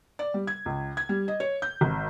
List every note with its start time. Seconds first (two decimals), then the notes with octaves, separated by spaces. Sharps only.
0.19 D5
0.34 G3
0.47 G#6
0.66 C#2
0.97 G#6
1.09 G3
1.28 D#5
1.40 C#5
1.62 G6
1.81 G#1